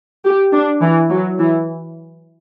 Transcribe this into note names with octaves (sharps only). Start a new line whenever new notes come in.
G4
D4
E3
F#3
E3